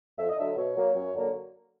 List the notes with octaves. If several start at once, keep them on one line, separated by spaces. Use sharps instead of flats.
F2 E5
D#5
D3 F#3 E5
B2 C#5
F#3 A#3
F#2
D3 F#3 A#3